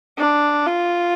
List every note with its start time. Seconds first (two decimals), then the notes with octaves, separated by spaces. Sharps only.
0.19 D4
0.66 F4